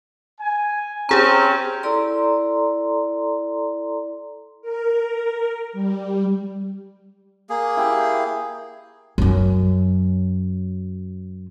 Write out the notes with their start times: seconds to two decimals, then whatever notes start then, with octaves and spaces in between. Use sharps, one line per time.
0.40 G#5
1.09 C4 C#4 G4 G#4 A#5
1.83 E4 A4 D5 A#5 C6
4.62 A#4
5.73 G3
7.50 A#3 G#4
7.77 E4 G4 G5
9.18 F#2 F#3